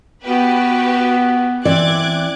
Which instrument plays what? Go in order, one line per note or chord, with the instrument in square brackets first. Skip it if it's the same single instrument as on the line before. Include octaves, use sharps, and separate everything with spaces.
[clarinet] B3 [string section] F#4 G4 B4
[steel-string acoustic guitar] E3 C4 D5 [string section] D6 F#6 G#6